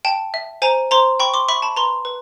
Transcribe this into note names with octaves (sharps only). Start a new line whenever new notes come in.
G5 A5
E5
C5 G#5 A#5
C5 A#5 C6
G5 B5 C#6
C6 D6
E5 B5 C#6
A5 B5
B4 A#5 C6
B4